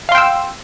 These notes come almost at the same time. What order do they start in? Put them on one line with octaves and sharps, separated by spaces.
F5 C6 G5 E6